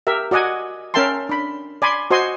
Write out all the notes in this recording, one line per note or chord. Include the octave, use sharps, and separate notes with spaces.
G4 A#4 E5
F#4 D5 D#5 F#5 G#5
C#4 A#4 E5 G5 A5 C6
D4 B5
D5 G#5 B5 C6
F#4 C5 D#5 G#5 C6